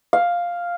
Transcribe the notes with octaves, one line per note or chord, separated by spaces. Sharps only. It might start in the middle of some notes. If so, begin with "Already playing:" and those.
F5